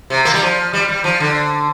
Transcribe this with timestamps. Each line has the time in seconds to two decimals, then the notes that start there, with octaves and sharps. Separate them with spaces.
0.10 C3
0.25 A#3
0.34 G3
0.42 F3
0.73 G3
0.88 G3
1.04 F3
1.20 D3